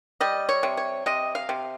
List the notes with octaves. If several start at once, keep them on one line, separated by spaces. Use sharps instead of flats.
G3 D#5
C#5
C3
C#5
C3 D#5
F5
C3